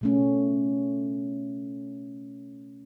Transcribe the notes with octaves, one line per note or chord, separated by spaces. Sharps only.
B2 A3 C#4